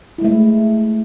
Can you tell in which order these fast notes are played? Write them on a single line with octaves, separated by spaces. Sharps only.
E4 G#3 A3